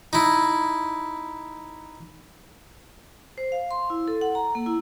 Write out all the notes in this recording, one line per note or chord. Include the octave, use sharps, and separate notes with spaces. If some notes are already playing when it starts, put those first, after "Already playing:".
D#4 E4
C5
F5
C6
E4
A4
F#5
A#5
A#3
E4